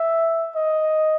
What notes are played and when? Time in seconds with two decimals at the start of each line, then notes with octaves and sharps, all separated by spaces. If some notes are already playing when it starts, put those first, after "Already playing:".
Already playing: E5
0.56 D#5